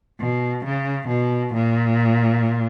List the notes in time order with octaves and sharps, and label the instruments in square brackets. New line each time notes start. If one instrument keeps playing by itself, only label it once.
[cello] B2
C#3
B2
A#2